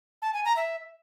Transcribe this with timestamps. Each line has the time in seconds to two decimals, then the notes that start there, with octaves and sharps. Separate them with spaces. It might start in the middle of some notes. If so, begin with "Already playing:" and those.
0.22 A5
0.33 G#5
0.45 A#5
0.56 E5